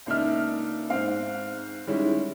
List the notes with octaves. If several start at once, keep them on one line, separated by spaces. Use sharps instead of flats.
C#2 A#3 D4 D#4 E5 F6
G#2 C4 F5
D#3 G3 G#3 C#4 E4